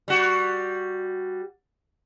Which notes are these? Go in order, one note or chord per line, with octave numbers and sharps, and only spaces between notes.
G3 F#4